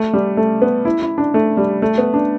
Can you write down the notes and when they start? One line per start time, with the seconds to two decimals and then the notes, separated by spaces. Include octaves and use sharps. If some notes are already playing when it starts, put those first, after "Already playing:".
Already playing: A3
0.13 G3
0.37 A3
0.62 B3
0.85 E4
1.02 E4
1.18 D4
1.34 A3
1.57 G3
1.82 A3
1.98 B3
2.14 D4